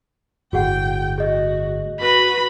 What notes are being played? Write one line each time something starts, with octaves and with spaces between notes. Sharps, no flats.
G1 A2 F#4 G#4 F#5 G5
F#4 G#4 D#5
F#4 B4 B5